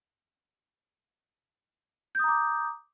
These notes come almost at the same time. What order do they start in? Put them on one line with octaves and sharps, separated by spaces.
G6 D#6 A#5 D6